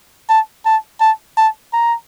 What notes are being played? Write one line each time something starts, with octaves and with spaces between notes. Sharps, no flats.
A5
A5
A5
A5
A#5